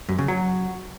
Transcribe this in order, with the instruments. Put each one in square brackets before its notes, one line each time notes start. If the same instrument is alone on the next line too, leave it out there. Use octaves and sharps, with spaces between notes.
[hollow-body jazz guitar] F#2
C#3
F#3